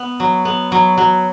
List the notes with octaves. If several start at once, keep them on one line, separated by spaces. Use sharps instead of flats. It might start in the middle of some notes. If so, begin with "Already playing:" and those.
Already playing: B3
F#3
B3
F#3
F#3